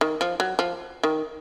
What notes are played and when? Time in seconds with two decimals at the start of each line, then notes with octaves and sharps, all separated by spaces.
0.01 D#3
0.21 F3
0.40 F#3
0.59 F3
1.03 D#3